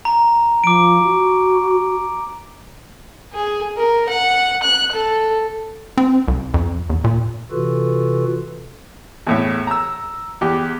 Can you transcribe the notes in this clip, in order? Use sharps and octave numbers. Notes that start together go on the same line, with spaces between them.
A#5
F3 D6 D7
F#4
G#4
A#4
F#5
F#6
A4
C4
C2
F2
E2
A#2
C3 E3 F4 F#4 A4 B4
E2 A2 E5
A#5 E6
E2 G4